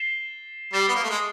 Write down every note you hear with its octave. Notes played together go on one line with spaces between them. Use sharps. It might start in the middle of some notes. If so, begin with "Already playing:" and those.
Already playing: A6 C7 E7 G7
G3 A6 C7 E7 G7
B3
A#3
A3
G#3